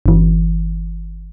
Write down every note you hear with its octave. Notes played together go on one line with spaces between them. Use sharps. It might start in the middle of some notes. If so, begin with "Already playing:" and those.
G1 E3